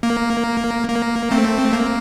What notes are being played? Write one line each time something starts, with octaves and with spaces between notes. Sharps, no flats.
A#3
A#3
A3 C4
A#3